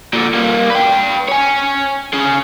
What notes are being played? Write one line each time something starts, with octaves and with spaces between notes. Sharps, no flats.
A#2 D3
G3 A#3
B4 G5
C#5 G#5
C#4 G#4